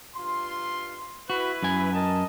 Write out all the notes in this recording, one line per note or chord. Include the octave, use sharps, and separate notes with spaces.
G2 F4 C6
E4 F#4 B4
F#2 G#5
A#4 D#5 A5